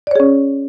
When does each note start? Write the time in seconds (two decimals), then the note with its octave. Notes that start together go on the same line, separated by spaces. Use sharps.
0.07 D5
0.11 C#5
0.16 G#4
0.20 C#4